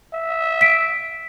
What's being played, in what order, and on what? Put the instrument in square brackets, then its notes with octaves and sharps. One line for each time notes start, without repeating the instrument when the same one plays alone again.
[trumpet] E5
[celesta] B6 D7